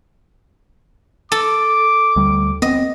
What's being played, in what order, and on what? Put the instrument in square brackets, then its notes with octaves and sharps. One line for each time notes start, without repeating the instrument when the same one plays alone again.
[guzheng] A4 [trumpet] D6
[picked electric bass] D2 G3
[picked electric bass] B3 C4 [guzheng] D#5